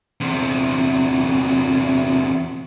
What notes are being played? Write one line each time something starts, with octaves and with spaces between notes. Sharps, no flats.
E2 C3